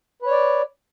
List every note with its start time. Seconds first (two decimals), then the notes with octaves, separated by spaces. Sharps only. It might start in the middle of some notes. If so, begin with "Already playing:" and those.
0.22 B4
0.27 C#5
0.31 D5